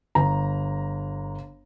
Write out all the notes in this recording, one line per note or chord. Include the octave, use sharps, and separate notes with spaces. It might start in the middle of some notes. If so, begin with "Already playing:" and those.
G1 A#5